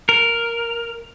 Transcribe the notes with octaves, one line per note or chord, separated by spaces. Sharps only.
A#4